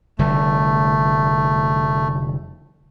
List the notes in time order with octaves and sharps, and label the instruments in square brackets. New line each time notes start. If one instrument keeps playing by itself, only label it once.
[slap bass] F1 D3 G3 [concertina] A3